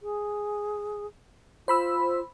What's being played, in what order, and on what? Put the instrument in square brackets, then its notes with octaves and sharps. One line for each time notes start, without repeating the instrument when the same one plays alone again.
[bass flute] G#4
[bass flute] F4 [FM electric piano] C5 B5 E6